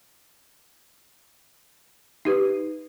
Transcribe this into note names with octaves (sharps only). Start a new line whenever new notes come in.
D#4 G4 B4